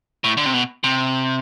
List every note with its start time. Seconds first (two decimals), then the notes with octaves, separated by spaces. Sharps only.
0.24 A2
0.37 D3
0.46 C3
0.54 B2
0.84 C3